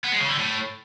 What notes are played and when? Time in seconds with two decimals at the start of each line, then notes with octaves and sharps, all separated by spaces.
0.05 B3
0.13 G#3
0.21 C#3
0.29 D3
0.37 A2